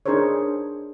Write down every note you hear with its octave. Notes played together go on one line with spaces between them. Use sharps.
D4 D#4 G#4 A#4 C5 C#5